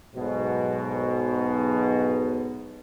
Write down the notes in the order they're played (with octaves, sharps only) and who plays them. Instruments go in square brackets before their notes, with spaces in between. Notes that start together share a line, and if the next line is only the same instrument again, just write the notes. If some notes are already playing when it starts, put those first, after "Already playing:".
[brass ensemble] B1 G#2 B2